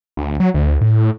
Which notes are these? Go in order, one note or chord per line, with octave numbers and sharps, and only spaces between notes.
D2
F#3
D2
A2